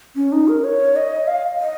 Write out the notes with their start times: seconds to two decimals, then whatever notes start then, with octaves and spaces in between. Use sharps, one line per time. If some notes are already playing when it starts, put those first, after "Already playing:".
0.16 C#4
0.32 D#4
0.48 A#4
0.64 C#5
0.96 D#5
1.27 F5
1.59 D#5